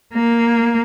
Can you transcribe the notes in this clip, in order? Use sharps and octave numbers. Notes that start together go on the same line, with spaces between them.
A#3